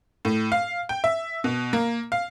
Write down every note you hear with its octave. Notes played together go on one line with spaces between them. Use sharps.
A2
F5
G5
E5
B2
A#3
F5